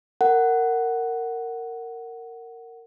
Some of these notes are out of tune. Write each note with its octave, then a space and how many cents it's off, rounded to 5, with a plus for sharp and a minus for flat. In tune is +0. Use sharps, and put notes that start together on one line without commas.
A#4 -20 F#5 +10